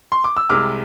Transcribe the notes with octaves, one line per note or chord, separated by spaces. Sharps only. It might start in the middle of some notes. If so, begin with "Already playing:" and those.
C6
D6
E6
C2 C3 G#3 D6 F6